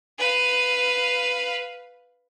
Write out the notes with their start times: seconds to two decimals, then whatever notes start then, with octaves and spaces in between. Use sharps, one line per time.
0.19 B4 F5